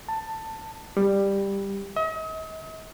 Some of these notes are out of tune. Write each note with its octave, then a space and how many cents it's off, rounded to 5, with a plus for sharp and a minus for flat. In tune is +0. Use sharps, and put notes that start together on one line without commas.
A5 +15
G3 +10
D#5 +40